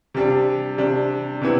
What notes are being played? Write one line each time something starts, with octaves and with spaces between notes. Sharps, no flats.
C3 G3 D4
C3 G3 D4
C3 E3 B3 E4